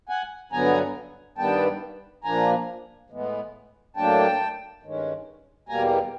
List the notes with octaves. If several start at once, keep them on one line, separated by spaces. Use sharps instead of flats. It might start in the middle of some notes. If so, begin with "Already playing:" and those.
F#5 G#5
G2 D3 F#3 B3 G#5 A#5
G2 D#3 G3 B3 G5 A5
A#2 F3 A#3 D4 G#5 A#5
A2 E3 G#3 B3
A2 F#3 A#3 D4 G5 A5
G2 D#3 G#3 C#4
E2 B2 G3 A#3 G#5 A#5